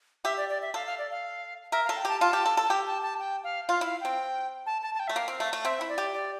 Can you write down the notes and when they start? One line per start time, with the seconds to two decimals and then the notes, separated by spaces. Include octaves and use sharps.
0.24 G4 E5
0.37 D5
0.49 D5
0.62 E5
0.74 A4 F5
0.86 F5
0.98 D5
1.11 F5
1.72 A#4 E5
1.85 F5
1.89 A4
1.97 G5
2.05 G4 A5
2.21 F4 A5
2.33 G4
2.46 A4
2.57 A4
2.63 A5
2.70 G4 G5
2.86 A5
3.03 A5
3.19 G5
3.44 F5
3.69 F4 F5
3.81 E4 F5
4.01 C4 G5
4.66 A5
4.82 A5
4.94 A5
5.00 G5
5.08 A3 E5
5.16 A#3 F5
5.28 C4
5.40 A3
5.53 A3
5.65 C4 E5
5.81 E4
5.89 D5
5.98 G4
6.13 D5